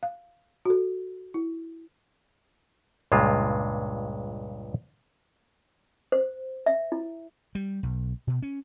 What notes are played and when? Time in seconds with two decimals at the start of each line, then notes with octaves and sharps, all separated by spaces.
0.03 F5
0.65 F#4 A4
1.34 E4
3.12 C#2 G2 A#2 G#3 F4
6.12 C5
6.66 E5
6.92 E4
7.55 G3
7.83 B1
8.27 B2
8.42 C#4